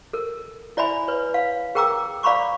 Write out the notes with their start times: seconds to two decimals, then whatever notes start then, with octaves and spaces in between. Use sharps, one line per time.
0.13 A4 A#4
0.77 E4 D5 E5 G#5 B5
1.08 B4 C#5
1.34 F5
1.75 G#4 A#4 G5 A#5 D6 E6
2.23 D5 F5 A#5 B5 C#6 D6